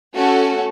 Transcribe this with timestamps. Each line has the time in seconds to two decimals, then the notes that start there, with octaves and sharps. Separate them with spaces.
0.15 A3 C#4 F#4 A4